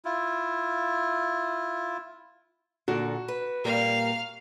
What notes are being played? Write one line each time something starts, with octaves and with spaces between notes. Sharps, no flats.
E4 F4
A#2 D3 F#4
B4
A#2 G3 A#3 F5